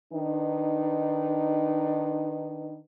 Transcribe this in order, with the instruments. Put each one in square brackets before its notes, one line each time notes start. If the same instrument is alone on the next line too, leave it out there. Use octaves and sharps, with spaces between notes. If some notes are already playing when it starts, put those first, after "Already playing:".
[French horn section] D#3 D4 D#4 B4